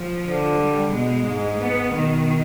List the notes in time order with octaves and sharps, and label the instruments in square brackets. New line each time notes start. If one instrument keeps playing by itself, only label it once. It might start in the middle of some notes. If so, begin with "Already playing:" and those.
Already playing: [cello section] F3
[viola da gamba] D3
[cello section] G3
[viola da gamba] B2 [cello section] G#3
[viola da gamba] G#2
[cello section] B3
[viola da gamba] B2 [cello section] D#3